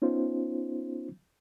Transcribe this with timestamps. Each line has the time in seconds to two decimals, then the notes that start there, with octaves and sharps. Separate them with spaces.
0.02 B3 C#4 D#4 F4 C5